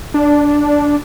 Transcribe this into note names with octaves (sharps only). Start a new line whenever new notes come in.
D4